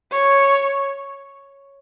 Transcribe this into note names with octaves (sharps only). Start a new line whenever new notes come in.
C#5